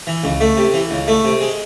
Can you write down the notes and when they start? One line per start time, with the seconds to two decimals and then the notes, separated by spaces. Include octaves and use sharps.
0.07 E3
0.24 C#2
0.41 A3
0.57 C3
0.74 E3
0.91 C#2
1.08 A3
1.25 C3
1.41 G#3